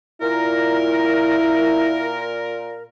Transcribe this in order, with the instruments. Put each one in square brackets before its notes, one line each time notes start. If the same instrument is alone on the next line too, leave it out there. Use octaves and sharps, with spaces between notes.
[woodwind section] A#2 A#4 [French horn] E4